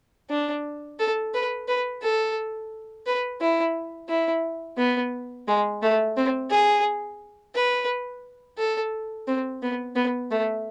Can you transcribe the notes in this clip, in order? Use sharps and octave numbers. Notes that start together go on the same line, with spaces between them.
D4
A4
B4
B4
A4
B4
E4
E4
B3
G#3
A3
C4
G#4
B4
A4
C4
B3
B3
A3